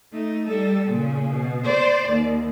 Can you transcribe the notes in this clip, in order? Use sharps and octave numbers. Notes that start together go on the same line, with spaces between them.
A3 D#4
G3 A4
A#2 C#3
B2
C5 D5
D#2